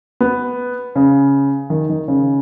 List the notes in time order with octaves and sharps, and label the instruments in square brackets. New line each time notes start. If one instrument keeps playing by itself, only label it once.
[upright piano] B3
C#3
D#3
D#3
C#3